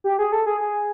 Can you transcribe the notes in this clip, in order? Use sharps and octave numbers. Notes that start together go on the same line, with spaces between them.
G4
G#4
A4
G#4
G#4